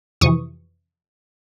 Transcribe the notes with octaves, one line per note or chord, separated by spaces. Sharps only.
F2 C3 E3 C#6 D#6